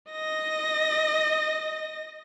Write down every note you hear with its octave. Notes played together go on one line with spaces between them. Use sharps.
D#5 A#6